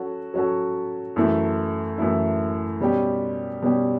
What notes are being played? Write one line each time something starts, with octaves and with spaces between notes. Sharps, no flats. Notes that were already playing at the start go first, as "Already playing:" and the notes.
Already playing: F#3 C#4 F#4 A4
F#3 C#4 F#4 A4
F#2 E3 A3 E4
F#2 E3 A3 E4
B2 G3 C#4 G4
B2 G3 C#4 G4